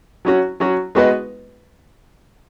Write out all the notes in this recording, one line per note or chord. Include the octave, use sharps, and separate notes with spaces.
F#3 C#4 F#4
F#3 C#4 F#4
G#3 B3 F#4 B4 D#5